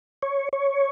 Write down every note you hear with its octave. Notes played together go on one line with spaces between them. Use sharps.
C#5
C#5